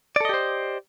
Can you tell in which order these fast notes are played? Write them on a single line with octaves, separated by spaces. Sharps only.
D5 A4 D#5 G4 C5